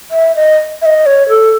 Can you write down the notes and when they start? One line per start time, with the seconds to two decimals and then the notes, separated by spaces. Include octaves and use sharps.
0.11 E5
0.36 D#5
0.82 E5
0.86 D#5
1.06 C#5
1.29 A4